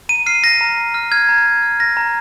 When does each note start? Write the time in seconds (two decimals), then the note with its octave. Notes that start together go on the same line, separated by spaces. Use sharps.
0.09 A#5 D#7
0.26 F6 C7
0.43 F6 A#6
0.61 A#5
0.77 A#5
0.94 F6
1.11 F6 G#6
1.29 A#5
1.46 A#5
1.63 F6
1.80 F6 A#6
1.97 A#5